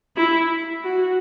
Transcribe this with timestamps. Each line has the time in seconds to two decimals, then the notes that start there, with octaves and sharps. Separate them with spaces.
0.17 E4
0.84 F#4